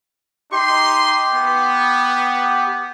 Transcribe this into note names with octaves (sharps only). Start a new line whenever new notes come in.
D#4 G4 C6
B3